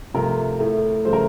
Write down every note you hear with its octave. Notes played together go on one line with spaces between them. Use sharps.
C3 F3 A3 A#4
A2 A3
C#3 F3 A3 C5
A#4